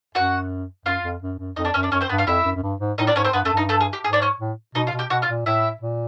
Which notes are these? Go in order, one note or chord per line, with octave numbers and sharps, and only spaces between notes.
F#2 F#4 F#5
F#2 F4 F5
F2
F#2
F#2
F2 D#4 D#5
D4 D5
F#2 C#4 C#5
D4 D5
F#2 C#4 C#5
C4 C5
G2 B3 B4
F4 F5
F2 E4 E5
F#2
F#2
G2
G#2
A2 D#4 D#5
D4 D5
G#2 C#4 C#5
C4 C5
G2 B3 B4
F#2 A3 A4
G2 D#4
A3 A4
G#4
G4
G#2 G#4
D4 D5
C#4 C#5
A2
B2 D#4 D#5
F4 F5
B2
G4 G5
B2 F#4 F#5
F4 F5
A#2
A2 E4 E5
A#2